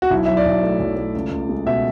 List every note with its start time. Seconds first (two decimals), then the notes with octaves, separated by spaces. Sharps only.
0.02 F#4
0.11 B1 E4
0.26 F#3 E5
0.37 D5
0.45 B1
0.63 A3
0.79 B1
0.97 A3
1.15 C#2
1.31 C#2
1.49 G#3
1.66 B2 E5